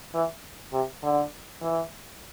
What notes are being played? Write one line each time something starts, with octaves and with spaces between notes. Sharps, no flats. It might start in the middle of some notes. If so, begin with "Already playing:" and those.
E3
C3
D3
E3